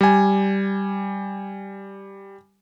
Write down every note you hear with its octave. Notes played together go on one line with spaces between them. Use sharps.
G3 G#5